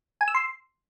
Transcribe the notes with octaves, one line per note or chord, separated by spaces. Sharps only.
G#5
E6
C6